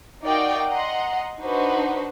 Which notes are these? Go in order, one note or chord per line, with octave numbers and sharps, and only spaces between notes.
D#4 F#4 A#4 D5 F5 G5
D#5 F#5 A#5 C6
D4 D#4 F#4 B4 C5